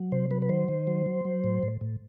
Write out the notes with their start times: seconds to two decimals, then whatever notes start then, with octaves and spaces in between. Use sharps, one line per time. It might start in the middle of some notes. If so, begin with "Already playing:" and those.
Already playing: F#3
0.12 C3 C5
0.31 F#3 B4
0.42 B4
0.49 D#3 C5
0.68 D#3
0.87 F#3
1.06 F#3
1.25 F#3
1.44 A2
1.63 A2
1.81 A2